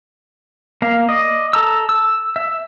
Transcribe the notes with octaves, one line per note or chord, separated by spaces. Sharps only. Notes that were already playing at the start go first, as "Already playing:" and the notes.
A#3 F5
D5 D#5
A4 A#5 E6
E6
E5